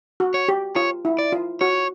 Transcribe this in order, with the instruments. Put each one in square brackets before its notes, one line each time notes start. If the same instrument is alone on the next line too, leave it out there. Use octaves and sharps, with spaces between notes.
[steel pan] F#4
[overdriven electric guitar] C#5
[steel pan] G4
[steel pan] F4 [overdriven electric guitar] C#5
[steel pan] E4
[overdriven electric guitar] D5
[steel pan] F4
[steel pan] F#4 [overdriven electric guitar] C#5